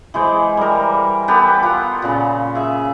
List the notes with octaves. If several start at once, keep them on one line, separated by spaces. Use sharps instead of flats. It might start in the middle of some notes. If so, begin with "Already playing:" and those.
E3 G#3 G#4 C5
G3 A#4
B3 G4 A4 A#4
F4 F#5
A#2 C#3
G#4 E5